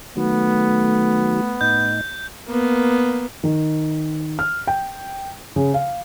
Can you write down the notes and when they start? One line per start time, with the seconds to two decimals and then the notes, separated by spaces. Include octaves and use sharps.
0.17 D#3 F#3 A3 B3
1.61 A2 D#4 G6
2.48 A#3 B3
3.44 D#3
4.39 F6
4.67 G5
5.56 C#3
5.74 F5